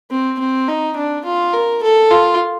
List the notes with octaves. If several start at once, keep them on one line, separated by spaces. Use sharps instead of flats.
C4
C4
D#4
D4
F4
A#4
A4
F4